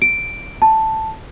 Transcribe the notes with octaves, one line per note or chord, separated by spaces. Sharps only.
D7
A5